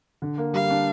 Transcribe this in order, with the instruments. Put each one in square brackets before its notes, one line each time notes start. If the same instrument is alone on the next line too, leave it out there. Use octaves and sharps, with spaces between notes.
[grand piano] D3
A#3
[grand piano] G3 [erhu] F5
[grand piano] D4